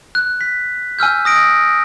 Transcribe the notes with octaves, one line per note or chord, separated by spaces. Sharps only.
F#6
B6
G#5 E6 F6 G6
D#6 A#6 D7